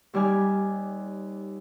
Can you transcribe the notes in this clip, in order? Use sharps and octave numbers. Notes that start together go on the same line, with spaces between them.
D#2 G3 D5 G#5 F6